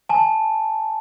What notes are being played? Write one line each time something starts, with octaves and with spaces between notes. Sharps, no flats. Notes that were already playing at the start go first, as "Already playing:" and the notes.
G#5 A5